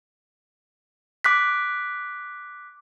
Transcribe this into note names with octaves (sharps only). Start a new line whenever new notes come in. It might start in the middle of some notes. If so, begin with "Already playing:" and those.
D6 F#6 B6